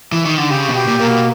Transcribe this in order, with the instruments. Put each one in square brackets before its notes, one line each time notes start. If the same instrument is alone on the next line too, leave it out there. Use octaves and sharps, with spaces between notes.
[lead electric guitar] E3
D#3
D3
[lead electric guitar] C#3 [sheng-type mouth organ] G4
[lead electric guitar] B2
[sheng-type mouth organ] G4
[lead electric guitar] A#2
[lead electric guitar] A#2 [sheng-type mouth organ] A#3
[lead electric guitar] B2